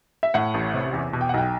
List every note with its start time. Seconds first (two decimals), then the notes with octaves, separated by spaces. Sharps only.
0.23 E5
0.34 A2 F#5
0.54 A1
0.74 C3
0.93 E2
1.13 B2
1.21 G5
1.29 F#5
1.34 B1 G5